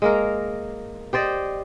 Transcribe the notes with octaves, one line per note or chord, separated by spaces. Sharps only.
G#3 A#3 A#4
G4 C5 D5 D#5